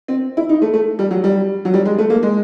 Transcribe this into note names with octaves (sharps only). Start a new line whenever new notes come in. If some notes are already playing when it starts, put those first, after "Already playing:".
C4
E4
D#4
A3
A3
G3
F#3
G3
F#3
G3
G#3
A3
A#3
G#3